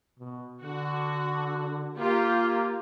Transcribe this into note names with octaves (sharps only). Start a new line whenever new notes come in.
B2
D3 F#4
A#3 F4 G4